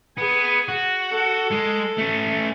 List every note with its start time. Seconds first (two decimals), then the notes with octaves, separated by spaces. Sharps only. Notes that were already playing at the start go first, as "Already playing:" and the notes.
0.17 B3 G#4 G#5
0.68 F#4
1.12 A4
1.51 G#3
1.98 A3 C#4